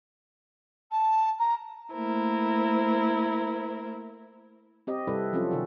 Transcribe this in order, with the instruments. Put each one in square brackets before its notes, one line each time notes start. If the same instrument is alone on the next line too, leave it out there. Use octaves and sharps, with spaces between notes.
[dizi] A5
A#5
[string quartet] A3 A#3 E4 A#4 C5
[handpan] C4 G4 D#5
C3 G3 C4 E4 A4 B4
F3 F#3 C4 C#4 F4 A4
C3 D#3 D#4 F#4